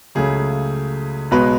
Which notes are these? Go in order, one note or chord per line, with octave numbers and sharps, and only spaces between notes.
C#2 C#3 F#3 A3 G#4
B1 B2 G#3 B4